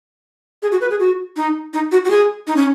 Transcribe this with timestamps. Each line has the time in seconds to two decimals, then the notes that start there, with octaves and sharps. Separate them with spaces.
0.63 G#4
0.72 F#4
0.81 B4
0.91 G#4
1.00 F#4
1.37 D#4
1.74 D#4
1.92 F#4
2.05 F#4
2.10 G#4
2.47 D#4
2.56 C#4